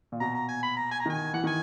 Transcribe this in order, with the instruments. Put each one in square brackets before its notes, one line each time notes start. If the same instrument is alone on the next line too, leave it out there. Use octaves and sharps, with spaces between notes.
[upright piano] A#2
[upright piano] B2 [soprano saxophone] A#5
[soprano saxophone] A#5
G#5
B5
A#5
G#5
A#5
[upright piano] D#3 [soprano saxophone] G#5
[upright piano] E3 [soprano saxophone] F#5
[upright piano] D#3 [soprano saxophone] G#5